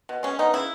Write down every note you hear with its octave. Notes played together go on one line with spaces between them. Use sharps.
B2
G#3 C#4
B3 D#4
C#3 E4